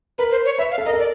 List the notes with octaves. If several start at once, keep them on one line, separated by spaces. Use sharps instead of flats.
A#4 B4
C5
C#5
B4 E5
F5
A4
A#4 D#5
A4
D5